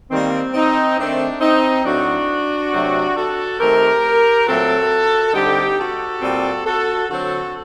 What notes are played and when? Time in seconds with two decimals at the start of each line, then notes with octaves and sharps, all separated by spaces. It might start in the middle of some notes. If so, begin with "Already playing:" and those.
0.10 D#3 G3 A#3 C4
0.54 C4 D#4
0.97 D#3 A3 C4 D4
1.41 C4 D#4
1.85 A2 F#3 A3 C4 D4 F#4
2.72 C3 F#3 A3 C4
3.16 F#4 A4
3.60 D#3 A3 C4 G4 A#4
4.47 A#2 F#3 A3 C4 F#4 A4
5.34 D3 G3 C4 D#4 G4
5.78 F#4 A4
6.22 A#2 G3 C4
6.65 F#4 A4
7.08 D3 F#3 C4 F#4 A4